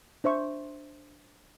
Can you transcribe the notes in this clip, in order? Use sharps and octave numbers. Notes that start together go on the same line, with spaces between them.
D4 C5 E5 C#6